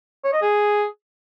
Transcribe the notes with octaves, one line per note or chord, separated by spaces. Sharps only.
C#5
D#5
G#4